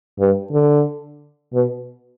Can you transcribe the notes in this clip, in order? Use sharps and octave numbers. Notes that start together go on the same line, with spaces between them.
G2
D3
B2